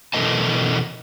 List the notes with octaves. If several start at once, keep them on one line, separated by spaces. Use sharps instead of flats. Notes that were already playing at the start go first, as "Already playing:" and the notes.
B2 E3 A4 A#4 D#5 A5